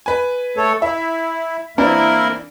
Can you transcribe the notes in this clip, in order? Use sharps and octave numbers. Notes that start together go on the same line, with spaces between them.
B4 G#5
A3 A4 C#5
E4 E5
E3 A#3 C4 D4 E4 A#4